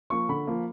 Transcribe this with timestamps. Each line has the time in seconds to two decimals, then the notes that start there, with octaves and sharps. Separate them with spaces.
0.10 F3 A#3 C#6
0.29 D3 B5
0.47 F3 A#3